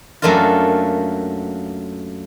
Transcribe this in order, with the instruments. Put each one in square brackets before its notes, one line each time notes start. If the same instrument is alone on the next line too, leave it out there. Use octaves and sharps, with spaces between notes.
[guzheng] F#2 F#3 A3 A#3 D4 F4